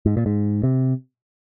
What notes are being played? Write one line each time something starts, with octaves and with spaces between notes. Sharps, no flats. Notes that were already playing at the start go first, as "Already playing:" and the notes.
G#2
A#2
G#2
C3